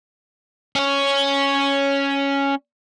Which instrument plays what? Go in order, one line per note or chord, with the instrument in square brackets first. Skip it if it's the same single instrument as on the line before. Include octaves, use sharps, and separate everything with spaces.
[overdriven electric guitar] C#4 C#5